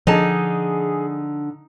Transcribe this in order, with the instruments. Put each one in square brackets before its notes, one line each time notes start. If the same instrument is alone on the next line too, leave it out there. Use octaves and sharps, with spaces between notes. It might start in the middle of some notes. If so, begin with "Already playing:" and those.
[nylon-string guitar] D3 A5 [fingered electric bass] F3 D4 [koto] D#4 [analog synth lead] G#4